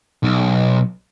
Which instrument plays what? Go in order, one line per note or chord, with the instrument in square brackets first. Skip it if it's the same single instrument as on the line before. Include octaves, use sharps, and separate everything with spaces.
[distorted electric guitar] B1